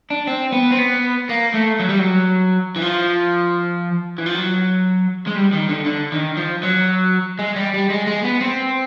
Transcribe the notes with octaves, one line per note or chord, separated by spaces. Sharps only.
D4
C4
B3
C4
B3
A#3
A3
F#3
G3
F#3
E3
F3
E3
F3
F#3
G#3
G3
D#3
D3
D3
D#3
F3
F#3
G#3
G3
G3
G#3
G#3
B3
C4